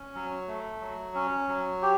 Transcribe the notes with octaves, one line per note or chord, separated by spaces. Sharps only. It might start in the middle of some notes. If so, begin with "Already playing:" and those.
Already playing: C#4
F#3
A3
F#3
C#4
F#3
G4